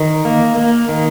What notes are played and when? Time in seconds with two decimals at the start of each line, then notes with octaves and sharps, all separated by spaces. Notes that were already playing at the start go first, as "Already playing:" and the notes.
Already playing: D#3
0.25 A#3
0.57 A#3
0.89 D#3